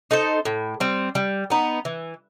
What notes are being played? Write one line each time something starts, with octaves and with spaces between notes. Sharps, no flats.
D#4 A4 C5
A2
G3 C4
G3
B3 D#4
E3